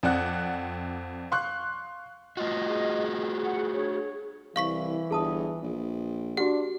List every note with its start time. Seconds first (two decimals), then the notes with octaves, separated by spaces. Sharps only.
0.03 F2 C4 D5 F#5 F#6
1.31 F5 C6 C#6 F#6
2.37 A3 F4 F#4 D#5
2.67 G#4
3.44 F#5
3.74 D4 C#5
4.56 C2 E3 F5 C#6 B6
5.11 G1 G#4 A5 D#6
5.63 A#1
6.37 D4 F#4 G4 F#5